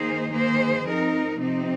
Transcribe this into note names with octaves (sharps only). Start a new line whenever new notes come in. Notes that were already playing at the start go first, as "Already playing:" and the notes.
Already playing: D#3 A#3 D#4 G#4 C5
D#3 A#3 G#4 C5
F3 C4 D#4 A#4
C3 F3 C4 D#4